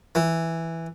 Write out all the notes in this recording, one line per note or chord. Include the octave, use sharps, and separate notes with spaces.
E3